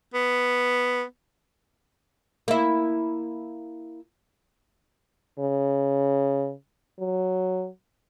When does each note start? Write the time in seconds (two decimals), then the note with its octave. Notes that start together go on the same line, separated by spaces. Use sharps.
0.14 B3
2.48 A#3 E4
5.39 C#3
6.99 F#3